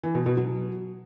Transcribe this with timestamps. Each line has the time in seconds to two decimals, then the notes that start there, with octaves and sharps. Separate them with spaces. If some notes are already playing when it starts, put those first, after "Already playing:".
0.03 E3
0.15 B2
0.26 B2
0.37 F#3